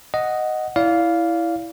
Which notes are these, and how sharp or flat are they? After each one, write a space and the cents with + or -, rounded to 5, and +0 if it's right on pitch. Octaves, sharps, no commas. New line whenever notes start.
D#5 +0 F#5 +0
E4 +0 D5 -30 F5 +0